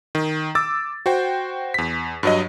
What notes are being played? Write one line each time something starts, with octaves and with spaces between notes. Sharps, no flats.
D#3
D6 E6 A6
F#4 C5 G5
E2 B6
G2 F#3 D#5